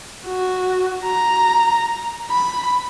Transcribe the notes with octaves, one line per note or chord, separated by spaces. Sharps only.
F#4
A#5
B5